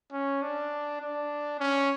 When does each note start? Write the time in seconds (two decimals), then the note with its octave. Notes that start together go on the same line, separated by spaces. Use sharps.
0.13 C#4
0.42 D4
1.01 D4
1.59 C#4